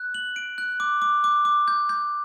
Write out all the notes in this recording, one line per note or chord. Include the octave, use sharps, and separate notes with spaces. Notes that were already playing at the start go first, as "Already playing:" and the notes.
Already playing: F#6
F#7
D7
F#6
D6
D6
D6
D6
G6
G6